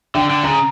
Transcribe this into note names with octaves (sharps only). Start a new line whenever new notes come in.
D3 G5
D3
C#3 A#5